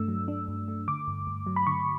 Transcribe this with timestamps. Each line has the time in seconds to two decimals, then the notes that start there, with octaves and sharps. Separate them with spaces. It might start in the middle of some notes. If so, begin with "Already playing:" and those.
Already playing: G2 A3 D4 E6
0.08 F#3
0.28 D4
0.48 G2
0.68 A3
0.88 D3 D6
1.08 G2
1.27 G2
1.47 F#3
1.56 B5
1.67 D3 C#6